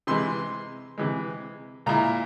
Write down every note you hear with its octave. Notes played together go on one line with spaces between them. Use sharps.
C3 E3 G#3 C6
C3 E3 G#3
A#2 G#3 E4 A#5